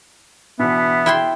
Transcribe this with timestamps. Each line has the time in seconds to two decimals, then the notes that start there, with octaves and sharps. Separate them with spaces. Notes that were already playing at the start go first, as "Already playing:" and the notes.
0.59 B2 E3 B3 D4 E5
1.06 E4 G5 C6